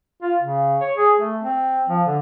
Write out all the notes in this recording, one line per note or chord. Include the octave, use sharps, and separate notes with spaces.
F4
C#3
C#5
G#4
A3
C4
F3
D3